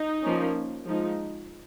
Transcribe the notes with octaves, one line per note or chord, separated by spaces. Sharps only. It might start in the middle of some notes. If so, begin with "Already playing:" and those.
Already playing: D#4
F3 A#3 C#4
F3 G#3 D#4